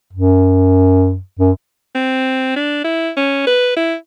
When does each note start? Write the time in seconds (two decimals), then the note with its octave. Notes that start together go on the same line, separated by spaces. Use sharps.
0.13 F#2
1.39 F#2
1.95 C4
2.56 D4
2.84 E4
3.17 C#4
3.47 B4
3.76 E4